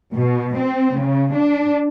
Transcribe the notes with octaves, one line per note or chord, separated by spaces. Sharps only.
B2
C4
C#3
D4